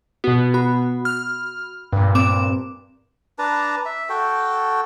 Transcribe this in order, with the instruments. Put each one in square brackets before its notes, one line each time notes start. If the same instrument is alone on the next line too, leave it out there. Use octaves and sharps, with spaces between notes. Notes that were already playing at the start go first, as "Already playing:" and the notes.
[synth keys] B2 B3 [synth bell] F#4
[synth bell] F#4 B5
[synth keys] F6
G2 A#2
[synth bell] C4 D6 E7
[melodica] D4 B4 A5 A#5
E5
F#4 A4 G5